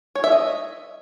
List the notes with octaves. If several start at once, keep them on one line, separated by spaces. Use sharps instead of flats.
C#5
E5
D#5